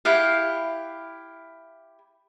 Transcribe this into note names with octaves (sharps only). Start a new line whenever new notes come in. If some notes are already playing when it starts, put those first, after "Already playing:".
E4 G4 F5 F#5